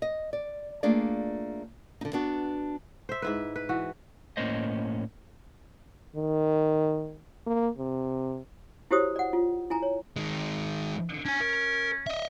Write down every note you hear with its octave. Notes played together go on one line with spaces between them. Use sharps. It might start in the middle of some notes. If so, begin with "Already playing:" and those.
D#5
D5
A3 A#3 D4 F4 G#4 D5
D3 D#4
B3 D4 F#4
C5 E5
G#2 E4 B4
B4
E3 F#4
A2 A#3 C#4 C5 D#5
D#3
A#3
C3
E4 F#4 G4 C5 C#5 D#6
D5 F#5
F4
E4 G#5 A#5
C#5
D#3 G#3
C#4 D4 G#5
A#4
D#5 E5